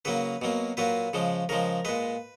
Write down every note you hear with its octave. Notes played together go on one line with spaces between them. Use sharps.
C#3 F#3 A#3 B4
B2 F#3 A#3
A#2 F#3 A#3 B4
C#3 F3 G#3
C#3 F3 G#3 A#4
A#2 G#3 B4